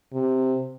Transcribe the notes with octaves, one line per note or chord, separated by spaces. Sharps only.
C3